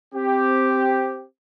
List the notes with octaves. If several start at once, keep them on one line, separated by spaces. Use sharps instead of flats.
C4 G4